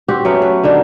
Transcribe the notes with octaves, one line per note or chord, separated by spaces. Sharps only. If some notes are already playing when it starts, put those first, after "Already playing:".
C4 F#4 G4
F#3 A3 B3 C#4
B4
D3 D#3 D4